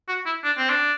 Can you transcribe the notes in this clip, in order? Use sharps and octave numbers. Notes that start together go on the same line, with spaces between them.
F#4
E4
D4
C4
D4